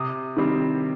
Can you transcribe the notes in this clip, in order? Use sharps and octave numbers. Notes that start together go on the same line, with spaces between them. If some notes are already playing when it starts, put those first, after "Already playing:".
Already playing: C3 D#6
D#3 G3 C4